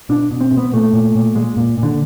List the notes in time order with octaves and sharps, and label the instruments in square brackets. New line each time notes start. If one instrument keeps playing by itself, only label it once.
[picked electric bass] B2 D4
B2
C4
B2
B3
A#2 A3
A#2
A#2
A#2 G#3
A#2
A#2
D3